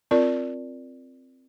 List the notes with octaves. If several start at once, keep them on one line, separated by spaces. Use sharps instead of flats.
C4 F4 A#4 D5